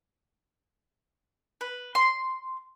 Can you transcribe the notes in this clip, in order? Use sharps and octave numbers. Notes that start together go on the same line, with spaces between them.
B4
C6